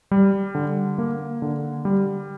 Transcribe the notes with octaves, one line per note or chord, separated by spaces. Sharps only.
G3
D3
A#3
D3
G3